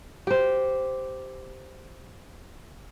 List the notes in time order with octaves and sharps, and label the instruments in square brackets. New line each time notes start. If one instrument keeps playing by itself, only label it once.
[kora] G4 C5